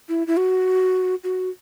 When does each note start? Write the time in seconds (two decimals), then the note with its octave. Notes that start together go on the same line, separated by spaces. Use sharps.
0.09 E4
0.27 E4
0.37 F#4
1.24 F#4